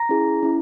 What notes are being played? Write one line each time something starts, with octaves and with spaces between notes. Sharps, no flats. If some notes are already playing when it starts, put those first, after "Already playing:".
Already playing: A#5 A#6
C#4 E4 G#4
C#4 E4